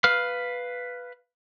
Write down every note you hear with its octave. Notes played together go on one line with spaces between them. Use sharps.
B4 F5 F6